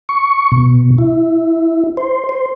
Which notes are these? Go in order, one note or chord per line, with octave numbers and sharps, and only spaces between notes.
C#6
B2
E4
C5
C5